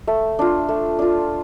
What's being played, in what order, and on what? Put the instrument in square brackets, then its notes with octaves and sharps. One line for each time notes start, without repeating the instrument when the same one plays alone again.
[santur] A3
D4 F4
A3
D4 F4